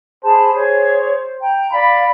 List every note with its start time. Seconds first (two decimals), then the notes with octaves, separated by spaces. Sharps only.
0.24 G#4 C5 A5 B5
0.54 G#4 C#5
1.41 G5 A#5
1.72 D5 F5 B5